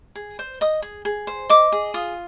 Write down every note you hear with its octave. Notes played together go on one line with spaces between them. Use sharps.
G#4
C5
D#5 D#6
G#4
G#4
C5
D#5 D6
G#4
F4 D#6